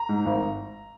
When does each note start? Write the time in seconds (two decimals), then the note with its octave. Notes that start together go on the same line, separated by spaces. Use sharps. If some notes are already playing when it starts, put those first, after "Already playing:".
Already playing: A#5
0.09 G#2
0.26 G#1